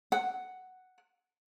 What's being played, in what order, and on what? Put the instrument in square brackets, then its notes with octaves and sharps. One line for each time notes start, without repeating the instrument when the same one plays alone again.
[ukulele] F#5